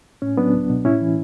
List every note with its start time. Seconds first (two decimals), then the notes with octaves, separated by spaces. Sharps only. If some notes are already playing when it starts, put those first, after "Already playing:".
0.22 A2 C#4
0.37 F#3 B3 D4
0.53 C#2
0.70 B2
0.85 A2 C#4 E4
1.01 E3